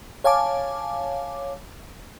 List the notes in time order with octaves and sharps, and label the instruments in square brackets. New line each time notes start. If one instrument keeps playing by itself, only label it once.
[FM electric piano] C#5 F5 G#5 A5 D6